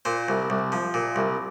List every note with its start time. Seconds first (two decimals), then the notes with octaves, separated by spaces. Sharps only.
0.05 A#2 C5
0.28 C2
0.50 C2
0.72 F3
0.94 A#2
1.16 C2